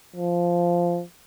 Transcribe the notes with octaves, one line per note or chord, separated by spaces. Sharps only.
F3